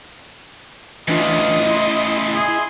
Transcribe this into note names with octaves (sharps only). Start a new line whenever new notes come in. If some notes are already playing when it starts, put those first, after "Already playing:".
A2 C#3 E3 D4 F4 D#5
E4 C6
G#4